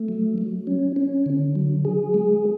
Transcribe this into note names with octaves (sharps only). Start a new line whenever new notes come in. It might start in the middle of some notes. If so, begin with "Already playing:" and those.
Already playing: A3
F#3
F#3
C#4
C#4
D3
F#3
G#4
G#3